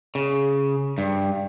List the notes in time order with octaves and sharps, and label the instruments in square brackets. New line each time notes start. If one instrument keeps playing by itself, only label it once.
[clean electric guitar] C#3
G2